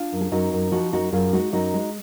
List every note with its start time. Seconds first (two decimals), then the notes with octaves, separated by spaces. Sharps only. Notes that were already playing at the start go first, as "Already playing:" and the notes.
Already playing: D4 F4
0.12 F#2
0.21 G#4
0.32 F#2 D#4 F#4
0.53 F#2
0.71 F3 D#4 F#4
0.93 F#2 D#4 F#4
1.12 F#2 F4 G#4
1.33 G#3 D#4 F#4
1.52 F#2 D#4 F#4
1.74 G#3